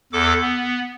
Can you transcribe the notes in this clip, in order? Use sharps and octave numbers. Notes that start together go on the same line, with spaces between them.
E2 A4 D6
B3